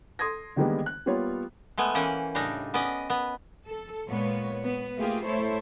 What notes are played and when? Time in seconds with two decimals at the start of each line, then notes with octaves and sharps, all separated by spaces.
0.19 A4 C6 D#6 G#6 A#6
0.56 D3 D#3 G3 G#3 A#3 B3
0.86 F#6
1.06 G3 A#3 B3 F4 C#5
1.78 G#3 A3 B3 G#5
1.95 E3 A#3 C#4 F#5 G5
2.35 A2 C#3 G3 D4 D#4 A#5
2.74 B3 C#4 D5 D#5
3.10 B3
3.67 A4
4.08 A#2 G#3 B3 C#5
4.64 B3
4.97 A3 A#3 F4 G4 G#4
5.25 A3 E4 A4 C5 C#5